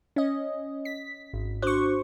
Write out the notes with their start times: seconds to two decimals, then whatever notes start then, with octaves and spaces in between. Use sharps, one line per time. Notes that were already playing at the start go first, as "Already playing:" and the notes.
0.16 C#4 D#5
0.85 B6
1.33 G#1
1.63 D4 F#4 C5 C#6